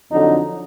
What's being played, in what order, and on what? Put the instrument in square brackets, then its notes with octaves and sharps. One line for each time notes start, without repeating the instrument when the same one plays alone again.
[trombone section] F2 D3 F#3 D#4